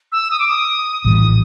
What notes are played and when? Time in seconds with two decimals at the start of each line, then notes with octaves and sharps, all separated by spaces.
0.12 E6
0.31 D#6
0.39 D6
0.48 D#6
1.04 A#1 A2 E3 G3 D#6